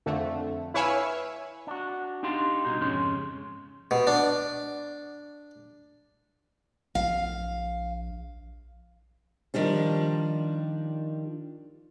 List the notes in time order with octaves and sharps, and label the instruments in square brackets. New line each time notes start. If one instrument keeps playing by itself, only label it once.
[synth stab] F2 D3 A3
E4 B4 C#5 E5 F5 G#5
[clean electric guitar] D4 F#4
D4 D#4 G4 F5 C6
C2 B2 D#4
F2 G#2 C#3 G#3 C#4 C6
[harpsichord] B2
D4
[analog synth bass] A#1 [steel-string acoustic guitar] F5
[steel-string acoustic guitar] D#3 F3 G3 D4